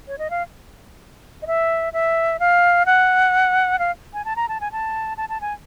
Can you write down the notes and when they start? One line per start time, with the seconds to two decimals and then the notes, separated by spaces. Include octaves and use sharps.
0.08 C#5
0.18 D#5
0.30 F5
1.42 D#5
1.47 E5
1.93 E5
2.40 F5
2.86 F#5
3.79 F5
4.14 G#5
4.25 A5
4.36 A#5
4.49 A5
4.61 G#5
4.72 A5
5.17 A5
5.29 A5
5.41 G#5